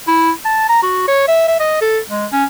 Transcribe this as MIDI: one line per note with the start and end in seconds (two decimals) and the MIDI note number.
0.08 0.31 64
0.45 0.65 81
0.69 0.82 82
0.83 1.06 66
1.08 1.24 73
1.28 1.47 76
1.48 1.55 76
1.60 1.80 75
1.81 1.99 69
2.09 2.26 56
2.32 2.45 61